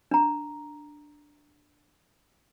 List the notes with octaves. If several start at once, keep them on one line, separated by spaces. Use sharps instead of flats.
D4 A#5